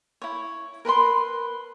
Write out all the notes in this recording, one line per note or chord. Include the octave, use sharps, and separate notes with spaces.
E4 C#5
A#4 B4 B5 C6